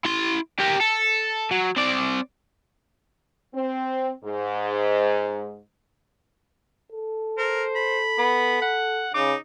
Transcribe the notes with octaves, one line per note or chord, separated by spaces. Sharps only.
E4 C6
G4 A#4
A4
F#3
C4 D5
C4
G#2
A4
A#4 C5
B5
B3
F#5
C#3 D#4 D6